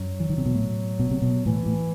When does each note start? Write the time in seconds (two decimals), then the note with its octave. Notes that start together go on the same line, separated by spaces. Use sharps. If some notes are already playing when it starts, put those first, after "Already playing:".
Already playing: F#2 F#3
0.20 E3
0.30 D#3
0.38 C3
0.46 B2
0.55 A2
0.99 B2
1.11 C3
1.22 B2
1.45 A2 E3
1.66 A2